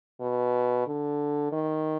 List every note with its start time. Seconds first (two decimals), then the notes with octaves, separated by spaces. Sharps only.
0.20 B2
0.86 D3
1.52 D#3